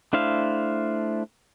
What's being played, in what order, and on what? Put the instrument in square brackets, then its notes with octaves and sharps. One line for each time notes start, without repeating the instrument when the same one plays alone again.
[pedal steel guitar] A3 D4 E4 C5 F5